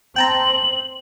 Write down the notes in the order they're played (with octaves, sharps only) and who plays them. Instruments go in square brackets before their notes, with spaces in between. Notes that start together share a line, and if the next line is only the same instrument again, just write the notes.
[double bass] C4 [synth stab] G5 A5 A#5 [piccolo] F#7